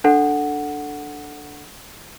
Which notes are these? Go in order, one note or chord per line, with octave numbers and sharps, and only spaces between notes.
D4 A4 F#5